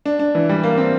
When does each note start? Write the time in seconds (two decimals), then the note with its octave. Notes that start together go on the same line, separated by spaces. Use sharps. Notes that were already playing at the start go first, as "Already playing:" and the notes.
0.06 D4
0.19 D4
0.35 E3
0.49 G3
0.64 A#3
0.78 C4